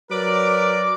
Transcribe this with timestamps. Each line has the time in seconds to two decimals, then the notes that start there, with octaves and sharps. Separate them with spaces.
0.11 F#3 A#4 B4 D5 D6